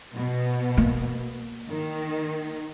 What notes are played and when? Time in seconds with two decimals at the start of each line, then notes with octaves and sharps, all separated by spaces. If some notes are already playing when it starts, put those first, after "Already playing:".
0.14 B2
0.77 A#3
1.69 D#3